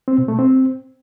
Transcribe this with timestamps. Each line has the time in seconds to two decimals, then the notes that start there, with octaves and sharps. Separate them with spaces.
0.08 C4
0.18 B2
0.28 A3
0.39 C4